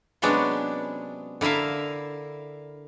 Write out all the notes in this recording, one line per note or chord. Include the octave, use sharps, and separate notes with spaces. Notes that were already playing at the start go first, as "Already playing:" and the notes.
C3 F#3 G#3 B3 C#4 D4
D3 E4 A#4 E5 F5